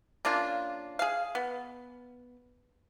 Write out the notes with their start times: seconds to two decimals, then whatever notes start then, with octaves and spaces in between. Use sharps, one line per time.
0.25 C#3 A#3 D4 F4
0.99 G#4 F5
1.35 B3